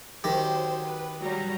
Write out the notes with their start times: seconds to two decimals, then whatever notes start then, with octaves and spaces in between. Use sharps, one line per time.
0.24 D#3 F#3 G4 C5
0.84 B4
1.20 F#3 G3 A#5